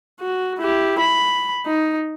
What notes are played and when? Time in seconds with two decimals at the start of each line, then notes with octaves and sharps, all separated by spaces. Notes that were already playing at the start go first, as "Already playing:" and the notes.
0.21 F#4
0.59 E4 G4
0.99 B5
1.66 D#4